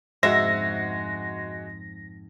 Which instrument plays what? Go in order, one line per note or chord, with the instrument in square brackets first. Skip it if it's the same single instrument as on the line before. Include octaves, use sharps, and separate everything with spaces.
[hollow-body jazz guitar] F2 G#2 C5 [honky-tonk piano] G#3 F#4 [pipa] E5 [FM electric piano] A#6